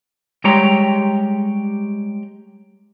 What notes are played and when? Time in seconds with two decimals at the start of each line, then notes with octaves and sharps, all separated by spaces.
0.44 G3 G#3 G4 C#5 A#5